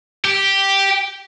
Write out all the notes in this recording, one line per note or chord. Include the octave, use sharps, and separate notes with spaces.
G4